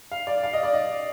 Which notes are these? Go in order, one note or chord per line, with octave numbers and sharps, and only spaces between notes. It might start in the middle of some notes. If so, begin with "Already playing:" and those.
F5
D5
F5
D#5
D5
D#5